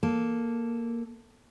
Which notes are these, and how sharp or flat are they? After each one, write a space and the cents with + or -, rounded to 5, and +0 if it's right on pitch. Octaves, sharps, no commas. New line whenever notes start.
A#3 +0 A4 +0